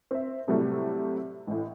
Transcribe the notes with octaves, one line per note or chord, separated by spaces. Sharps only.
C4 E5
A2 C3 F#3 G3 A3
A1 A2